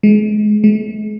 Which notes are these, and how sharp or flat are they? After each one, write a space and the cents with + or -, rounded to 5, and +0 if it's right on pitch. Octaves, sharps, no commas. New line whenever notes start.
G#3 +30
G#3 +45